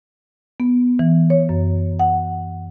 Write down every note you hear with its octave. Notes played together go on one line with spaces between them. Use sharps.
B3
E3
C#5
F#2
F#5